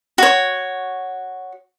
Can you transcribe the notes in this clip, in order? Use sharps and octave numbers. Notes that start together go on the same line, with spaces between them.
F#4 C#5